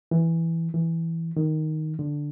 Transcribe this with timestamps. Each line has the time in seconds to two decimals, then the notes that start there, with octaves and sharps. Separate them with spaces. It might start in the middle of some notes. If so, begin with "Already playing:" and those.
0.11 E3
0.74 E3
1.37 D#3
1.99 D3